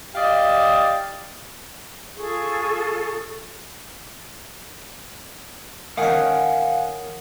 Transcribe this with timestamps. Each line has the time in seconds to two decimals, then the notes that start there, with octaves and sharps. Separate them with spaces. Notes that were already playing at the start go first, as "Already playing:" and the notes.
0.14 G4 D5 D#5 F5
2.18 F4 G#4 A4 C#6
5.97 D#3 C#4 F5 F#5 G#5